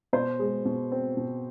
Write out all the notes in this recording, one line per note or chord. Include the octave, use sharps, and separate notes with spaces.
B2 C5
G#3
B2
C4
B2